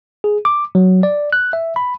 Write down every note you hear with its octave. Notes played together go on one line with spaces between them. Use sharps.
G#4
D6
F#3
D5
F#6
E5
B5